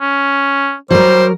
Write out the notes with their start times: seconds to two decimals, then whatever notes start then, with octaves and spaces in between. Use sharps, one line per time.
0.01 C#4
0.90 F#3 G3 A#4 C5